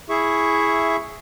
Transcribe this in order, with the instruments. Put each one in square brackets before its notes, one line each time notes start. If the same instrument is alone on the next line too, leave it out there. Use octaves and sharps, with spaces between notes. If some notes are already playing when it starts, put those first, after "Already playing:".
[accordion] E4 G#4 E5 C#6